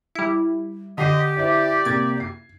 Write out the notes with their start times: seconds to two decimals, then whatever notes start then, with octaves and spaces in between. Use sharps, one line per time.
0.15 G3 E4
0.98 D3 G4 D#5 B6 C7 D#7
1.37 E4 C5 D5 E5
1.85 C3 A#3 G#6 A6
2.20 C7